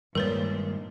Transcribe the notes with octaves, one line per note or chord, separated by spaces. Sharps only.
G2 A#2 D#3 G#3 A#4 B4 C#5